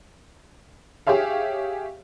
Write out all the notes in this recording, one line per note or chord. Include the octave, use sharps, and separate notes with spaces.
G4 G#4 C#5 E5 F5